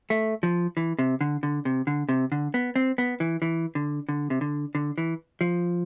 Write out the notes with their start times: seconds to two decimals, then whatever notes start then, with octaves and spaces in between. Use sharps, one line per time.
0.10 A3
0.43 F3
0.77 E3
0.99 C3
1.21 D3
1.43 D3
1.65 C3
1.87 D3
2.09 C3
2.32 D3
2.54 B3
2.76 C4
2.98 B3
3.20 E3
3.42 E3
3.75 D3
4.09 D3
4.30 C3
4.41 D3
4.75 D3
4.98 E3
5.41 F3